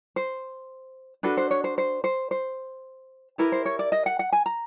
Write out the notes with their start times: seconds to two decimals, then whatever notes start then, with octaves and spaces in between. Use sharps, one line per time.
0.16 C5
1.23 D4 F#4 A4 B4
1.37 C5
1.51 C#5
1.64 C5
1.78 C5
2.04 C5
2.31 C5
3.38 E4 G4 A#4 B4
3.52 C5
3.65 C#5
3.79 D5
3.92 D#5
4.06 F#5
4.19 F#5
4.32 G#5
4.46 A#5